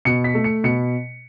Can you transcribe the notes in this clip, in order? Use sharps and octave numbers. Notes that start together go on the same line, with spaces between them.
B2 C#7
B6
A3
C#7
B2 C#7